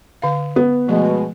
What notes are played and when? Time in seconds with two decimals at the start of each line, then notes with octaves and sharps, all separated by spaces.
0.22 D3 F5
0.56 B3
0.88 B2 F3 G#3 A3